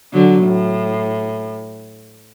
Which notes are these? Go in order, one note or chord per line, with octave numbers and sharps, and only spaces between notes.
D3 F#3
A2